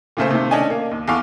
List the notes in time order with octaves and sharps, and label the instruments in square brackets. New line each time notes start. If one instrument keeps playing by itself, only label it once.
[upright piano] A#2 C#3 A3 C5
C3 D#3 A3
C#4 D4 D#5 G#5
A#3
D#2
E2 A4 F5 C#6 D6